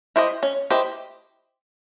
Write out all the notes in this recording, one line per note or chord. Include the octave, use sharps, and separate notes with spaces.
E4 G4 C5 D#5
C#4
E4 G4 C5 D#5